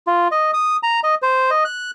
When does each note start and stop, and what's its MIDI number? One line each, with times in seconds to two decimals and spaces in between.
0.07 0.28 65
0.31 0.51 75
0.54 0.77 87
0.83 1.00 82
1.03 1.15 75
1.22 1.50 72
1.51 1.64 75
1.65 1.91 90